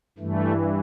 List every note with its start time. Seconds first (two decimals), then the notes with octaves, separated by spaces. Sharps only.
0.18 G2 E3 A3